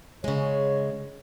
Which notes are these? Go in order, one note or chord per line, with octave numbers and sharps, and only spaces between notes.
C#3 G#3 C#5